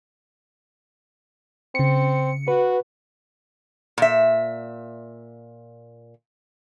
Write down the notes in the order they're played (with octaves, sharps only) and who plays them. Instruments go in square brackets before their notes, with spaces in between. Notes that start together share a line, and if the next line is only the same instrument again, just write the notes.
[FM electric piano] C#3 C#7 [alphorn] C4
[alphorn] F#4 [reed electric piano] B4
[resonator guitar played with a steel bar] A#2 E5